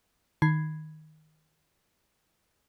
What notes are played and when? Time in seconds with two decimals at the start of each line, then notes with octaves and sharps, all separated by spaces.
0.42 D#3 B5 G#6 C7